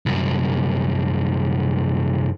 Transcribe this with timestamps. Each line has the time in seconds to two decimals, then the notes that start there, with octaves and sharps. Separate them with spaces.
0.06 C2 F#2